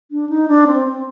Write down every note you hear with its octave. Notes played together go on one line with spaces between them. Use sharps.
D4
D#4
D4
C4
C4